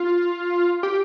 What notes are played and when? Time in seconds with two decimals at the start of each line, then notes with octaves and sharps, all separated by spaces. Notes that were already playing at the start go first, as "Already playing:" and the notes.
Already playing: F4
0.83 G4